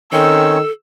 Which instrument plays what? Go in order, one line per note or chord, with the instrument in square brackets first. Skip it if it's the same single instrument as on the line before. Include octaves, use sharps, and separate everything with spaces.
[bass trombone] D#3 [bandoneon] C4 C#4 C#5 [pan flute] A4 [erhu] E6